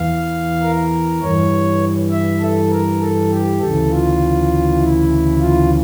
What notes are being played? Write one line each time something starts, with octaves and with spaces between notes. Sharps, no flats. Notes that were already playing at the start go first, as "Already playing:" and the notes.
Already playing: E2 E3 F5
A#4
G2 E3 C#5
E5
A4
A#4
A4
G4
D2 C#3 E3 A4
F4
E4
F4